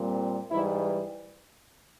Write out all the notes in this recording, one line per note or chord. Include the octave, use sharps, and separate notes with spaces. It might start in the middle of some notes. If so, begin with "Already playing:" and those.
Already playing: A#2 G3 C4
G#2 E3 G3 E4